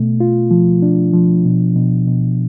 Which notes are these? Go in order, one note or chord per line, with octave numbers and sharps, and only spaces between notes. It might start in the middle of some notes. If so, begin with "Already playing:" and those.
Already playing: B2 A3
F4
F3
D4
F3
B2
B2
B2